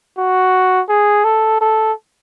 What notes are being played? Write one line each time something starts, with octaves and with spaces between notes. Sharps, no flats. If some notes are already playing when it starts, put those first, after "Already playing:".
F#4
G#4
A4
A4